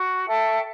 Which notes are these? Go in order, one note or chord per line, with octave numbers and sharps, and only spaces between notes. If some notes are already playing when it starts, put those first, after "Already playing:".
Already playing: F#4
A4 E5 G5